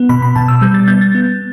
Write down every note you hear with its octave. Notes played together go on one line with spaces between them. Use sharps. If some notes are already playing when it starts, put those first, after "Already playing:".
Already playing: B3
B2 B5
B5
B2 A5
E6
G3 G6
A6
B3 G6
A6
B3